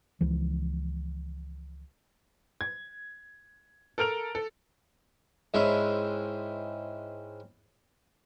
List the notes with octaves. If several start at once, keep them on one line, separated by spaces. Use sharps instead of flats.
C#2 E3 F3
G#6
A4 A#4 F6 D7 F7
A4
G#2 G#3 C4 C#4 E4